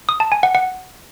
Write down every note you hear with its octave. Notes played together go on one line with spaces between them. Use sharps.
D#6
A5
G#5
F#5
F#5